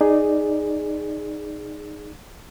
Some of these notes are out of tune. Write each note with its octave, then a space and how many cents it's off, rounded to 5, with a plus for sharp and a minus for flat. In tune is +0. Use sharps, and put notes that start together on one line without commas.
D#4 -10 G#4 +0 D5 +0